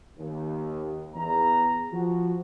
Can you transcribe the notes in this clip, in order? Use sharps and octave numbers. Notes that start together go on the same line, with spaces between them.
D#2
E2 A#5
F3 F#4